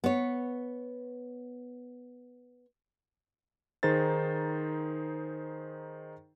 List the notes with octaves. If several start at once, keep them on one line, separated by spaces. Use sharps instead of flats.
B3 C#5
D#3 D#4 G#4 C5 A6